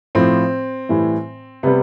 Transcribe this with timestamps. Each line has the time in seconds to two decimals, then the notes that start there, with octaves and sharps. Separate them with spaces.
0.15 A2 F3 C4
0.89 A2 E3 G3
1.63 C3 G3 B3